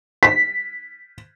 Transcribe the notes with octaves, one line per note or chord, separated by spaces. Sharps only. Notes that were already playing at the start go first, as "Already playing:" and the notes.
B6